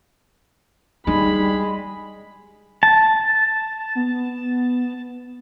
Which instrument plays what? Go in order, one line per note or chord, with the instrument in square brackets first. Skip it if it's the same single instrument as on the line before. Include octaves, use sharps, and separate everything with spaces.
[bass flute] G3 [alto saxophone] G#3 [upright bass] D#4 [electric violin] B5
[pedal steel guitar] A5
[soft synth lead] B3